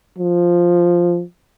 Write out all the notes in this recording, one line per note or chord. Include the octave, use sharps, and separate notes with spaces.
F3